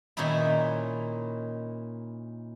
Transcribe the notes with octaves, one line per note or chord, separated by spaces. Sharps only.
A#2 D#3 C#4 D#4 E4